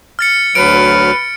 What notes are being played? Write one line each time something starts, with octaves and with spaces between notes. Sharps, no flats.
F6 A6 C#7
D2 F#3 B4 F6 D7